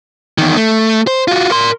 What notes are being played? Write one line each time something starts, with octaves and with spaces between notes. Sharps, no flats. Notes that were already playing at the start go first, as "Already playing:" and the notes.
E2 D#3
A3
C5
F4 F#4
A#4 C6